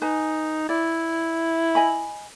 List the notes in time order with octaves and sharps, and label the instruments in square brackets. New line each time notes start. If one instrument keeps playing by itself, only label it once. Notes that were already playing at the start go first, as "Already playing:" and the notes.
[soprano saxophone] D#4 [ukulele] B4 G#5
[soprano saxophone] E4 [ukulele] D5
[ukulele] D#5 G#5 B5